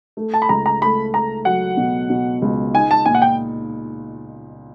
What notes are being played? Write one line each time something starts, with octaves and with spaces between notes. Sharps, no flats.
A3
A5
B5
C#2 A#5
A#5
A3 B5
A3 A#5
F#3 F#5
B2
B2
C#2
D#4 G#5
A5
A#2 G#5
F#5
G5